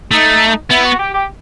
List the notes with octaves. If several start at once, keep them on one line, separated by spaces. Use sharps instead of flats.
A3 D#4
B3 E4
F#4
G4
G4